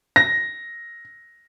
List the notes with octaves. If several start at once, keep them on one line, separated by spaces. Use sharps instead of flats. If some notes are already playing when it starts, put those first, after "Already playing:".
A#6